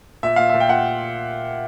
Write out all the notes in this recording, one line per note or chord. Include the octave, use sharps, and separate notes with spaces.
A#2 E5
A#2 F5
E5
A#2
G5
A#2 F#5